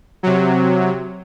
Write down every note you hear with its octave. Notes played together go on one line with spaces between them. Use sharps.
C3 F#3